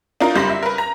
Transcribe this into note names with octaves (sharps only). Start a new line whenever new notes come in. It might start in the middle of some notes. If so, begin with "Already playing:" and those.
D4 D#4 F4 A#4
F#1 G3 B5 C6 A#6
E5
A#4 B4
A#5